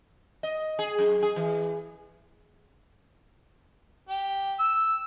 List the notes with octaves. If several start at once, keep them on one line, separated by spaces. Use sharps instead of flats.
D#5
G#4
F#2
G#4
E3
G4
E6